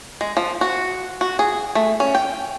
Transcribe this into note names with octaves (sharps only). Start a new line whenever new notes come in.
G#3
F3
F#4
F#4
G#4
A3
C#4
G5